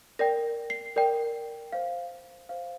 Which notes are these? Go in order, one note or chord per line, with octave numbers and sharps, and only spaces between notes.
A#4 D5 G5 A#6
C7
A#4 D5 G5
C5 F5
C5 F5